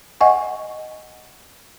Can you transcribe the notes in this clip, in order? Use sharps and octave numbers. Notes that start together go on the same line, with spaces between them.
D#5 F#5 G#5 C#6